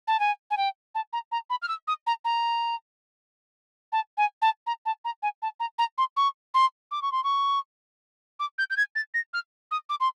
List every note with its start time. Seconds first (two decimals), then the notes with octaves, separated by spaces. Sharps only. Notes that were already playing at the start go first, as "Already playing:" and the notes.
0.08 A5
0.20 G#5
0.51 G#5
0.57 G5
0.95 A5
1.13 A#5
1.32 A#5
1.50 B5
1.62 F6
1.68 E6
1.88 D#6
2.07 A#5
2.25 A#5
3.92 A5
4.18 G#5
4.42 A5
4.67 A#5
4.86 A5
5.05 A#5
5.23 G#5
5.42 A5
5.60 A#5
5.79 A#5
5.98 C6
6.17 C#6
6.54 C6
6.91 D6
7.02 C#6
7.12 C6
7.24 C#6
8.40 D6
8.58 G6
8.70 G6
8.77 G#6
8.96 A6
9.14 A#6
9.34 F6
9.71 D#6
9.89 D6
10.00 C6